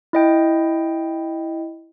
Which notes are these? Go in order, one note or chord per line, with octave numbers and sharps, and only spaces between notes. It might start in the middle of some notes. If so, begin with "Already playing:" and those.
E4 D#5 G5